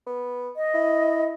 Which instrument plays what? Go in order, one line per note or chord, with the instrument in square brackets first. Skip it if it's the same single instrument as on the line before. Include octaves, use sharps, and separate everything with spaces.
[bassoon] B3
[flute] D#5
[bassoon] E4